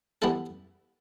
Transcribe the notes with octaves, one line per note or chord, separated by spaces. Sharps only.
E3 G3 B3 E4 A4